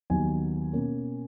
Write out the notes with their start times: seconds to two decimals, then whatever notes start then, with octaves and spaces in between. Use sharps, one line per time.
0.10 D#2 D#3 F#3 B3 G#5
0.73 B2 A#3 C#4